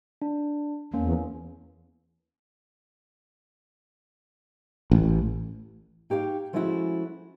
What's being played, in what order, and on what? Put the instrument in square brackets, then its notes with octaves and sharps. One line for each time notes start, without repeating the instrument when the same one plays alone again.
[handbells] D4
[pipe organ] E2 [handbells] A#3 C#4
[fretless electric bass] A1
[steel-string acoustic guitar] D#4 G4 C#5 D5 F5
F3 G#3 A3 C#4 E4 F#4